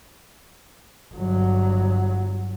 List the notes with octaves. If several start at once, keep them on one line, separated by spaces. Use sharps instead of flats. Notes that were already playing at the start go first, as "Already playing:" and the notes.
G1 F#3